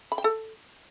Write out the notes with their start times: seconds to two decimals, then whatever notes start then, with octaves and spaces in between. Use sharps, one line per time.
0.12 B5
0.18 G5
0.24 A4